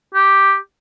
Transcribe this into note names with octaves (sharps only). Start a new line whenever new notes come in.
G4